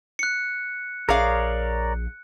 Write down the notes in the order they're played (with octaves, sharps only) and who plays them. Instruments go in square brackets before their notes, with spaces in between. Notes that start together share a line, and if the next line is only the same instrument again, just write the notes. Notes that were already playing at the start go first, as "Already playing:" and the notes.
[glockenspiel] F#6 C#7
[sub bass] A#1 [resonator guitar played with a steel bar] G#4 F5 [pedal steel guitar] A#4 C#5 D5